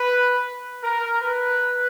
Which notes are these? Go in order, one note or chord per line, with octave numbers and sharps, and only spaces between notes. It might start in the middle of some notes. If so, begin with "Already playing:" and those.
Already playing: B4
A#4
B4